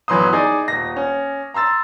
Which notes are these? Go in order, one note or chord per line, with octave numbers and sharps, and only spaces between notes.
G1 E3 F#3 B4 C6 D#6
D#4 G#4 D5
D#1 A#6
C#4
A#5 C6 E6 A6